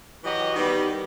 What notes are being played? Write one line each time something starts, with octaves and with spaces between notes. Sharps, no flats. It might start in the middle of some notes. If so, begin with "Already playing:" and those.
E3 F#3 F#4 G4 D#5
D#3 G3 B3 G4